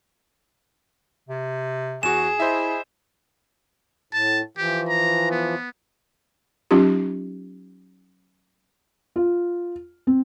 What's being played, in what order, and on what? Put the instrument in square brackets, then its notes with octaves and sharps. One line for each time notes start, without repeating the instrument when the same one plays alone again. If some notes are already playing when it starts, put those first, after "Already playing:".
[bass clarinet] C3
[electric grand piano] E2 F#4 [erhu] G#4 [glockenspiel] E7
[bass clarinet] E4 [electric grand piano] C5 D#5 E5
[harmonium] A2 [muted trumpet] A5
[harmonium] E3 F3 [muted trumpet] G4
[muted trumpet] A#5
B3
[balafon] F#3 C#4 D#4 F4 G4
[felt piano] F4
C4